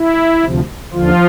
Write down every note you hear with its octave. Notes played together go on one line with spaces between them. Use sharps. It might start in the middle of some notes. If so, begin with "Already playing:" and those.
Already playing: E4
D2 C3 F3
D#2 D3 F3 F4